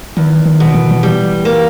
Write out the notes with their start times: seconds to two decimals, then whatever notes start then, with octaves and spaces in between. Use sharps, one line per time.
0.17 E2 D#3
0.45 D#3
0.60 B2
0.74 E3
0.91 E3
1.03 G3
1.45 A#3